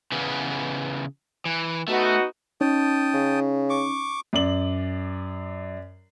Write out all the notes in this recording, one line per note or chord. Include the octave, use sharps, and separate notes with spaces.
C#3 E3 B3
E3
A3 B3 D#4 F#4
C#4 D#4 C#5 G5 A5 D#6
C#3
C#6 D6
F#2 D5 F#7